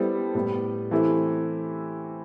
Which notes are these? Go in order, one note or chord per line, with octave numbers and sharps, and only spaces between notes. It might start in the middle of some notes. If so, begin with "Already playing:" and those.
Already playing: G3 B3 E4 A4 C5
A2 G3 B3
E3 A3 C4 E4 G4